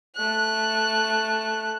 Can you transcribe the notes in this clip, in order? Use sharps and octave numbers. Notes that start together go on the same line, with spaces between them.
A3 F#6